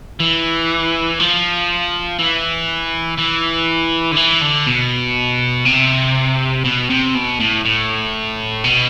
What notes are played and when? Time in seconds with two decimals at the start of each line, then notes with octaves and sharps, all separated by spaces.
0.20 E3
1.20 F3
2.19 E3
3.18 E3
4.12 D3
4.17 E3
4.42 D3
4.67 B2
5.66 C3
6.65 B2
6.90 C3
7.15 B2
7.40 A2
7.65 A2
8.64 B2